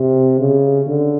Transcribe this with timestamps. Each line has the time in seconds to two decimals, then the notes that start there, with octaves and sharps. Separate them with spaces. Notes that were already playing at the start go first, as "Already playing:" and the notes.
Already playing: C3
0.40 C#3
0.88 D3